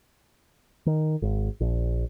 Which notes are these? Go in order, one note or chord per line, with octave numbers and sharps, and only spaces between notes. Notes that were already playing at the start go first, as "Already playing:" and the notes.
D#3
G#1
A#1